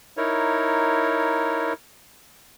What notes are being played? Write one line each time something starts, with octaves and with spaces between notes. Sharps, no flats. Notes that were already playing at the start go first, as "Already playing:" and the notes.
D#4 E4 A#4 C#5